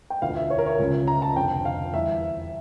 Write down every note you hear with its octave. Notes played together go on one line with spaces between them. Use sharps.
G5
E1 D2 D3 F3 F5
E5
C#5
A#4
C#5
C#2 C#3 F3
A#5
A5
F1 F2 D3 G5
F5
E2 E3 G3 E5